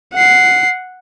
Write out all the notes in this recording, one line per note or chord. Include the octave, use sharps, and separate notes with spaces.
F#5 C7